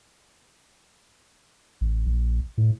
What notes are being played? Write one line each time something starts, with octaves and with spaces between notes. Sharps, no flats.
A1
A#1
A2